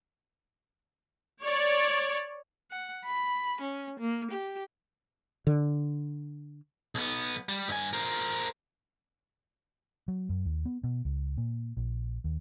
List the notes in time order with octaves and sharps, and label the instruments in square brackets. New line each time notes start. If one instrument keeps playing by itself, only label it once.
[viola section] C#5 D5
[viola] F#5
B5
C#4
A#3
G4
[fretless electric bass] D3
[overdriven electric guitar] B1 B3
G3
G2 G#5
A#4 C5
[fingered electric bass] F#3
F#2
D#2
B3
B2
C#2
A#2
A#1
D#2